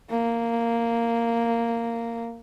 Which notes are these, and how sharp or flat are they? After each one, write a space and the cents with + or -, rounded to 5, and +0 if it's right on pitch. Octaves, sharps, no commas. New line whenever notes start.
A#3 -10